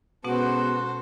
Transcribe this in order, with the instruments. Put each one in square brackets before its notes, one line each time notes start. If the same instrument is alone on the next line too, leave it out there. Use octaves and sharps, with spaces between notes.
[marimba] B2 C#4 F#5 [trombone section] G#3 B3 [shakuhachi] F#4 [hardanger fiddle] A4 C5